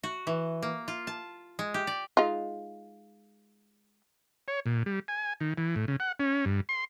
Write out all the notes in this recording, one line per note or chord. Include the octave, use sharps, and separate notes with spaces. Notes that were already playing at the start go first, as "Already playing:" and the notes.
F#4
E3
A#3
F4
A5
G#3
G4
D5
G#3 D#4 F4
C#5
A#2
G3
G#5
D#3
E3
A2
C#3
F#5
C#4
G2
C6